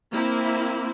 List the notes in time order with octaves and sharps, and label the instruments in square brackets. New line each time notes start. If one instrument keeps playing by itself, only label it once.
[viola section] A#3 C4 E4